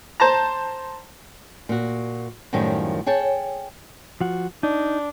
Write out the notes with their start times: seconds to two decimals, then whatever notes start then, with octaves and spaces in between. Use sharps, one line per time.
0.20 C5 A5 A#5
1.69 A#2 F#4
2.53 F#2 A2 D#3 F3 G3
3.06 G#4 C#5 G5 A5
4.21 F3 F#4
4.63 D4 D#4